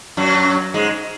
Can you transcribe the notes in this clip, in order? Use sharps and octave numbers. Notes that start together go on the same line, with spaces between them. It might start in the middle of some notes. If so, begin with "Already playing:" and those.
F#2 F#3
G#2 G#3